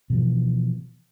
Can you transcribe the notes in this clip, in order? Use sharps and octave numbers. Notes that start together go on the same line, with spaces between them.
B2 E3 F3